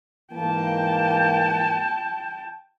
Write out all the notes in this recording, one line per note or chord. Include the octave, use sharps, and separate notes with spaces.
G#2 E3 A#3 G5 A5